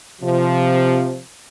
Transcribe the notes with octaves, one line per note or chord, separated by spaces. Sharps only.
C3 F3